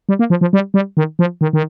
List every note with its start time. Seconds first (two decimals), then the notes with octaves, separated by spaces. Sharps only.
0.09 G3
0.19 A#3
0.30 F3
0.41 F3
0.53 G3
0.74 G3
0.97 D#3
1.19 F3
1.41 D#3
1.53 D#3